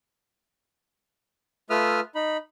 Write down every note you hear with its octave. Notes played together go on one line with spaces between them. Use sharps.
A3 F4 B4 E5 D#6 F6
D#4 B5